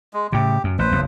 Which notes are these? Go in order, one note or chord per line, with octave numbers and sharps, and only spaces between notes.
G#3
A2 C#3 G4
F#2
A1 B4 C5
F#1 B1 E2